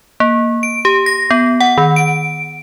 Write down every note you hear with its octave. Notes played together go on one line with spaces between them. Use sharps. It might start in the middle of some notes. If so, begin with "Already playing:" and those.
A#3
D7
G4
A#6
B3
F#5
D#3
D7